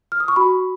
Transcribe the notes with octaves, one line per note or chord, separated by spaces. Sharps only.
F6
D#6
C#6
F#4 B5